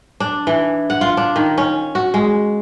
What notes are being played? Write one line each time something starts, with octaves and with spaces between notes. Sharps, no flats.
D4
E3
F#5
F4
D4
D#3
C#4
F#4
G#3